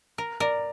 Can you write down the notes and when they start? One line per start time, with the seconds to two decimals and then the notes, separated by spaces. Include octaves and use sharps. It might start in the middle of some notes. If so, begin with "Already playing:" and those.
0.18 A#4
0.40 A#4 D5